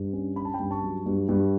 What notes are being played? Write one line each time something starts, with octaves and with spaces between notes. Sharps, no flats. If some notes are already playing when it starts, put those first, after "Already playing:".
Already playing: G2
C#4
C#4 B5
A5
G5 B5
G2
A5 C#6
F#3
G2
G2